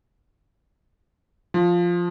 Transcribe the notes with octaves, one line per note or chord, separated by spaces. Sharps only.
F3